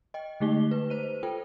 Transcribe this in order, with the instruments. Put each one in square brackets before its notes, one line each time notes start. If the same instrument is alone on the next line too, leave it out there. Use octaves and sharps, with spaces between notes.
[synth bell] D#5 G5
D3 G#3 A3 D#4 G4 G7
B4
C5 D#7
F4 A4 G5